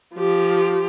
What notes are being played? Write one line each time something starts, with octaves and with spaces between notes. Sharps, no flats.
F3 G4